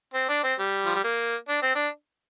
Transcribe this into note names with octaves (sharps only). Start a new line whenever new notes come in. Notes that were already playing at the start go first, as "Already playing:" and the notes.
C4
D4
C4
G3
F3
G3
A#3
D4
C4
D4